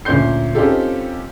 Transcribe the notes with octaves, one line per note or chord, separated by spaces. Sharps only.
D2 A#2 C#4 C6 G6 C7
C4 C#4 D#4 F4 G4 A4